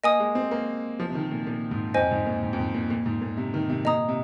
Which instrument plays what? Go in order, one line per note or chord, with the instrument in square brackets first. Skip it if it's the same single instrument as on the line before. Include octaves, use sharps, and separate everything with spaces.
[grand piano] A#3 [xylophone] D#5 G#5 D#6
[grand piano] G#3
C4
A#3
F3
C3
D#3
A#2
A#2
G#2
[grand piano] F2 [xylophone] C5 D#5 G#5
[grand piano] G#2
A#2
G#2
F2
G#2
A#2
A#2
G#2
A#2
C3
D#3
C3
[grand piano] A#2 [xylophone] D#5 A#5 D#6
[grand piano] C3